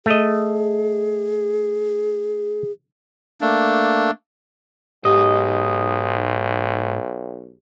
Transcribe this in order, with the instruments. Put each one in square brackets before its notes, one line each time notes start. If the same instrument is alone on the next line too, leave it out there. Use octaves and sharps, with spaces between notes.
[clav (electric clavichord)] A3 D#5 [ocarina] G#4
[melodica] A3 A#3 D4
[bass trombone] B1 [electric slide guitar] G#2 [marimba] G4 [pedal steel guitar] D#5